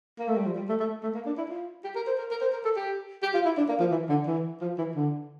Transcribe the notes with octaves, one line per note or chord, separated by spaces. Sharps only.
A#3
A3
G3
F3
G3
A3
A3
A3
A#3
D4
E4
F4
G4
A#4
C5
A#4
A#4
C5
A#4
A4
G4
G4
F4
E4
D4
A#3
F3
E3
D3
E3
F3
E3
D3